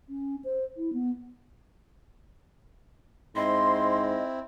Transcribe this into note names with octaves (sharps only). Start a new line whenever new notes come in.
C#4
C5
E4
B3
G#2 C4 E4 D#5 C6